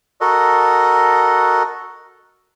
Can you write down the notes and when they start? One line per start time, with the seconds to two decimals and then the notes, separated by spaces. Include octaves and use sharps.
0.21 F#4 A4 A#4 D#5